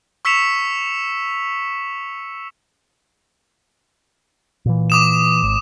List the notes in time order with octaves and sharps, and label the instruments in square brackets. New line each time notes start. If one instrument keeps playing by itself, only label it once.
[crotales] C#6 E6 B6 C#7 E7 F7
[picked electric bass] A#2 E3
[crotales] D6 D#6 E7
[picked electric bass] G#1